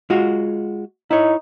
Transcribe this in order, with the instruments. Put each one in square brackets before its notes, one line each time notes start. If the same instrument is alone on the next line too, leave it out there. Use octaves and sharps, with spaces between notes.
[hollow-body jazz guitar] G#3 F4 F#4
[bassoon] D#4 [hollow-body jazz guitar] E4 C#5